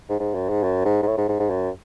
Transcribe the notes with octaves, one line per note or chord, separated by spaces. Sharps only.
G#2
G#2
F#2
G#2
F#2
G#2
G#2
A2
G#2
G#2
G#2
F#2